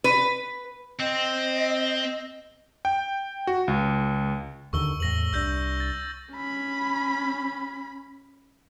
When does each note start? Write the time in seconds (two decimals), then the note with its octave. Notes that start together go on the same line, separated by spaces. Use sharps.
0.04 B4
1.00 C4 D#5
2.85 G5
3.47 F#4
3.68 C#2
4.73 D#2 D3 D#3 C#6 E6 G7
5.00 E2 A2 A#6 F#7
5.33 C2 D4 E6 G6 A#6
5.80 A6
6.32 C#4 B5